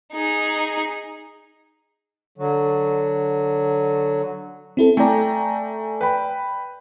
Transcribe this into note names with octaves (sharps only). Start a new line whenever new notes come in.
D#4 G#4
D3 F#3
C4 E4 A4
A3 D5 G5 G#5 A#5
B4 G5 B5